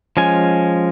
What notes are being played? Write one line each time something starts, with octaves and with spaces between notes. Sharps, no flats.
F3 G#3 C#4 G#5